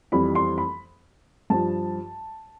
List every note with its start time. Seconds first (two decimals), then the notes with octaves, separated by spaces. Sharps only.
0.12 F2 E3 G3 B5
0.35 C6
0.58 B5
1.50 G2 F3 A5